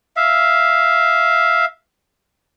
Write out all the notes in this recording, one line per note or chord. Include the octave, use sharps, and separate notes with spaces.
E5 F5